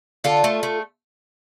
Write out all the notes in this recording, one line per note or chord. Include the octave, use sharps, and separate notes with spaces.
D3 F4 A4
A3
A3